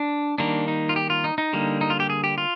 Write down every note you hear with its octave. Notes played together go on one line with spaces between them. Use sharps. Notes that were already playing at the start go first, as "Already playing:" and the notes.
Already playing: D4
D#3 G3 A#3 D4
D#4
F4
G4
F4
D#4
D#4
D3 G3 A#3
D#4
F4
G4
G#4
G4
F4